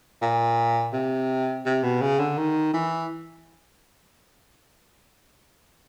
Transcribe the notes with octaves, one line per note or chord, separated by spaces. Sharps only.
A#2
C3
C3
B2
C#3
D3
D#3
E3